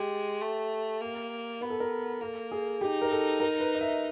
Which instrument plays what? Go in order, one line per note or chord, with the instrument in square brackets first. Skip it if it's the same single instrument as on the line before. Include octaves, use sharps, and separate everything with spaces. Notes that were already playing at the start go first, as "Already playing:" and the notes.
Already playing: [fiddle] G#3 [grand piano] G4
[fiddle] A3
A#3
[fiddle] B3 [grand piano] A#4
[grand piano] A4
A#4
[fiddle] A#3 [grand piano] A4
[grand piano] G#4
[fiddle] D#4 [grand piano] G4
[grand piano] A#4
A4
A#4
B4
D#5
E5